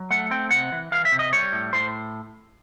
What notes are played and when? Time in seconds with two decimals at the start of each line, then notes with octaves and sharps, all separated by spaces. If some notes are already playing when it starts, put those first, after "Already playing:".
Already playing: F#3
0.10 A3 F#5
0.31 C4 G5
0.51 C3 F#5
0.72 E3
0.92 E3 F5
1.05 E5
1.12 C3
1.19 D#5
1.33 G3 C#5
1.53 A2
1.73 A2 C5